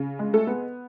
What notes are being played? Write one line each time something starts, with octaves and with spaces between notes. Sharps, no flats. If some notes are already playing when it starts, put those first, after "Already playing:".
Already playing: C#3
G#3
A3 A4
B3